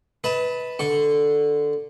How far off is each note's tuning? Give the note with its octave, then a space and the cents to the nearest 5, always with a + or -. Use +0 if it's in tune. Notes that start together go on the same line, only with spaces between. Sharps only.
B4 +0 D#5 +40 A5 +0
D3 +0 C#6 -10